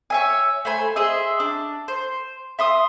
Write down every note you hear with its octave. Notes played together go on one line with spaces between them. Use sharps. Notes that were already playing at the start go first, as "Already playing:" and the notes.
C#5 E5 G#5
A3 C5 G#5 B5
G#4 C5 D#5 E5
D4
C5
E5 C6 D#6